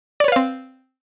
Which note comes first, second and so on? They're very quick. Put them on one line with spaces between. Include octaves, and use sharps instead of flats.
D5 C#5 B4 F5 C4